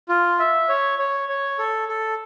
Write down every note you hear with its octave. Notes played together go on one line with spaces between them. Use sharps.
F4
E5
C#5
C#5
C#5
A4
A4